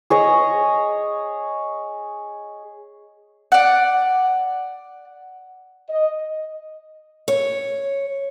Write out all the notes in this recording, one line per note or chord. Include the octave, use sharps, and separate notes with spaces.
G#4 C#5 D#5
D5 F#5
D#5
C#5